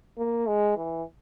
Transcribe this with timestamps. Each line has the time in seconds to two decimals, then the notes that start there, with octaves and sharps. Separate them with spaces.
0.18 A#3
0.47 G#3
0.77 E3